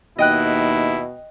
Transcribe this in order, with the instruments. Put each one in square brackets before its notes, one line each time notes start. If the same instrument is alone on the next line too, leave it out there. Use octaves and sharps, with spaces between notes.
[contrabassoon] D#2 [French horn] B2 [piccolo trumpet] E4 [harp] D#5 G5 F#6